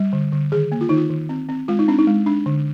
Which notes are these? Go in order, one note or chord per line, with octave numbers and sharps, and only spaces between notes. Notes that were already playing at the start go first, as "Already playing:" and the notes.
Already playing: G3
D3
D3
D#3 G#4
A#3
F4
D#3 D#4
F4
D#3
C4
C4
G#3 F4
D#4
C4 D4
D#4
G#3
D4
D3